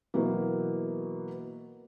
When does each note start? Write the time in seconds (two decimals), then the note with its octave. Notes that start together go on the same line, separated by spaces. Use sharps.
0.14 B2 E3 F#3 A#3